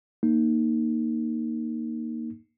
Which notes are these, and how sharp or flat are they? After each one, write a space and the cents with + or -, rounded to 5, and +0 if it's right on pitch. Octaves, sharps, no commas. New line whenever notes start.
A#3 +0 D#4 -5